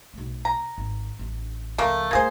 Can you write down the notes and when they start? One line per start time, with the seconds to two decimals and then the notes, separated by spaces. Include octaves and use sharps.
0.14 B1 A3
0.45 A#5
0.78 G#1
1.19 A1 D4
1.78 C#2 F3 A3 A#3
2.11 G#2 A3 A#3 G#4 C5